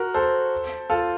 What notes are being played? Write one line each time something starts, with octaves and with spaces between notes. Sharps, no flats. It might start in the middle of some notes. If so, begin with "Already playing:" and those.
Already playing: F#4 A#4
A4 C5
F4 A4